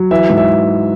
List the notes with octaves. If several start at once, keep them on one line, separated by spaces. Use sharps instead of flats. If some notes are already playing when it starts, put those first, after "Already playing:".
Already playing: F#3
E3 E5
G#2
E5